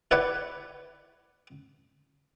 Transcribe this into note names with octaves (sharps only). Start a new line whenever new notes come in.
E4 B4 C#5 D5 F#5